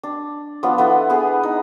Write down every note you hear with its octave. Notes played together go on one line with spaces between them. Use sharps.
D4
F3 B3 D4 F#5
B3 E4 A4
B3 G#4
D#4